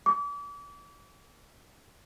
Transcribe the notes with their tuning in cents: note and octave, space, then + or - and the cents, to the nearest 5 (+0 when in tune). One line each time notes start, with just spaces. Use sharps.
D6 -35